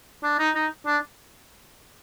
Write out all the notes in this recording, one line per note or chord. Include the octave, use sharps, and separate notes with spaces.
D4
D#4
D#4
D4